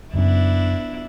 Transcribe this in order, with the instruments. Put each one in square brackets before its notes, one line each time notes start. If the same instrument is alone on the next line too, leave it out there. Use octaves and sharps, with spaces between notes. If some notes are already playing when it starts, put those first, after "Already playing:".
[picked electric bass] F#1 F#2 [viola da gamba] B3 D4 E4